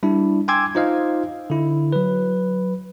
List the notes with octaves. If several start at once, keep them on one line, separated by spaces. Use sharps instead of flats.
G3 D4 E4
G5 G#5 C6 D6 E6 G#6
D#4 F4 C5 D#5 F5
D3 E4
F#3 B4